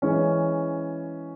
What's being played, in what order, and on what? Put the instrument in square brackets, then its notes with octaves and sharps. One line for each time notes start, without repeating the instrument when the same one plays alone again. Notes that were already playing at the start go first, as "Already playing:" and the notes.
[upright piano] E3 G#3 C#4